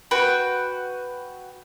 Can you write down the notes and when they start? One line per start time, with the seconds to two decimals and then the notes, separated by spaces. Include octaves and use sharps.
0.11 F#4 B4 G5